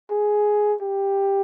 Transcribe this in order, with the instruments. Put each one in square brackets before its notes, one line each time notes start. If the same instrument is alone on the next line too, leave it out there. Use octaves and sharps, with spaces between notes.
[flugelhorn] G#4
G4